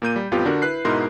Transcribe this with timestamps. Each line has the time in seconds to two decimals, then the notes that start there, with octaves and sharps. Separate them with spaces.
0.02 A#2 A#3 G6 D#7
0.16 G3
0.31 A1 F2 B3 F4 G4
0.46 D3 D4 F#4 A#4
0.62 E4 B4 F#6 C7
0.85 G#2 B2 D#4 E4 A#4 C6